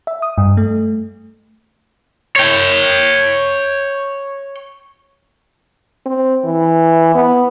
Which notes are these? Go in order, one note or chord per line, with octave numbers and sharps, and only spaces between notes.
E5
D#6
G2
A3
C#5 G5
C4
E3
B3